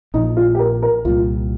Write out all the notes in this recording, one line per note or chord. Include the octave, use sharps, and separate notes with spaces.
A#1 A#2 F3 D#4
F4
G4
A#4
A#4
C2 A#2 G3 F4